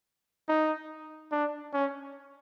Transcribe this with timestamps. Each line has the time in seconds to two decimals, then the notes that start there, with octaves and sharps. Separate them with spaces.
0.48 D#4
1.32 D4
1.73 C#4